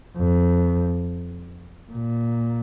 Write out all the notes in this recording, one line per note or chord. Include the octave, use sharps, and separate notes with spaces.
F2
A#2